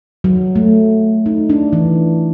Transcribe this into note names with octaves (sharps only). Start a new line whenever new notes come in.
F#3
A3
D#4
D4
E3